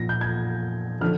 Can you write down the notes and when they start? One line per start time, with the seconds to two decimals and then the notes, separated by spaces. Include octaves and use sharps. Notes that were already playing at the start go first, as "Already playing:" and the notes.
Already playing: A#2 F3 A#6
0.09 G6
0.21 G#6
1.01 D3 F3 F6